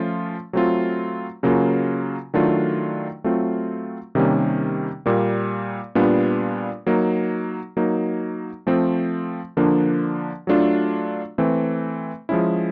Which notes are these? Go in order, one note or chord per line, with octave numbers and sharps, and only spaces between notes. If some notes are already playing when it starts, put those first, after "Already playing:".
Already playing: F3 A3 C#4 F4
F#3 A3 C4 F4
C#3 F#3 A#3 C#4 F4
D#3 F#3 A3 D4 F4
F#3 A3 C4 F4
C3 D#3 G3 A#3 C#4
A#2 G3 A#3
A#2 G3 B3 D4 F4
F#3 A#3 D#4
F#3 A#3 D#4
F3 A3 C4
D3 F3 A#3 D4
F#3 A3 D4 F4
E3 A3 C4
F3 G#3 C#4 E4